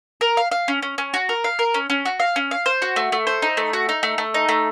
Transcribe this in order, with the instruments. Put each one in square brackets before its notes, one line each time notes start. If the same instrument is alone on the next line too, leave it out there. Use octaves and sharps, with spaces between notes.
[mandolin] A#4
F5
F5
C#4
C#4
C#4
F#4
A#4
F5
A#4
C#4
C#4
F#4
F5
C#4
F5
C5
F#4
A3
A3
C5
D#4
A3
F#4
D#4
A3
A3
D#4
A3